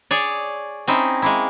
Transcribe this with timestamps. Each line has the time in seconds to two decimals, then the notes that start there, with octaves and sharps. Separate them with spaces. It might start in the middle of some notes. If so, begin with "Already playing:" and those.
0.11 G#4 C#5 D5
0.88 C4 C#4 D#4 E4
1.22 G#3 A#3 E4